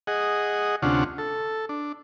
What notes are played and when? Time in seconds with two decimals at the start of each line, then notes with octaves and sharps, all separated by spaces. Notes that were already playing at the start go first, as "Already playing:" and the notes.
0.07 G#4 D#5 F#5
0.82 D2 C3 C#4 D4 F4 F#5
1.18 A4
1.69 D4